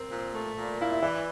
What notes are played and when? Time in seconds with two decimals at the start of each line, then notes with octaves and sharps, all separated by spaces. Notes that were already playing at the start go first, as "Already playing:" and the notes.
Already playing: C4 A#4 C5
0.12 A#2
0.35 A3
0.57 A#2
0.80 E4 F5
0.92 E5
1.02 E3 D5